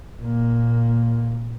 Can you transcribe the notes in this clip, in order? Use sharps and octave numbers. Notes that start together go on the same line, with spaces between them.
A#2 A#3